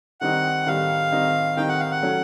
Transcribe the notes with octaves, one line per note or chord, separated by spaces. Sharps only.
D#3 G3 C4 D#4 F#5
D#3 G3 C4 D#4 F5
D#3 G3 C4 D#4
D#3 G3 C4 D#4 G5
F#5
F5
F#5
F#3 A3 C#4